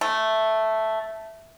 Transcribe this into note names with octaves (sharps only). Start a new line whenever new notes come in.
A3